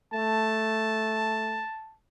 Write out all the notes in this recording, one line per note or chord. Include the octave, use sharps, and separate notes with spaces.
A3 A5